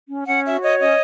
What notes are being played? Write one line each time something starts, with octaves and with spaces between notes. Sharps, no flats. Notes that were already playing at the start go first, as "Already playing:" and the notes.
C#4
C#4 F#5
F#4 E5
C#5 D#5
C#4 D#5